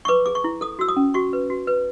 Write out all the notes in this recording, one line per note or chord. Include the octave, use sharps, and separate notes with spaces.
C#6
B4 D6
G#4 D6
C#6
E4
A4 D#6
F#4 E6
D#6
C#4
F#4 C#6
B4
F#4
B4